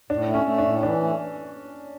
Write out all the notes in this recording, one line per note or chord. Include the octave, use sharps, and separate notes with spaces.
A2 D4
A3
C#4
A3
D4
A2
E3 D4
A3